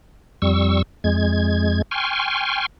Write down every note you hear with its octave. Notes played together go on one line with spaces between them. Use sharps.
F2 G3 C#6 E6
F2 G#3 G#6
G5 G#5 C6 C#6 F6